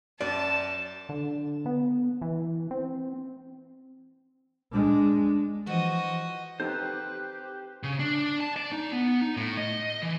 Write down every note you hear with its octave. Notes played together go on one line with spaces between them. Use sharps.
F#2 D5 A5
D3
B3
E3
C4
G#3 D4
E3 F3 F#4 D#5
C4 D#4 G4 A4 B4 C5
C#3
D4
A5
D5
D#4
B3
D#4
A2
D#5
E3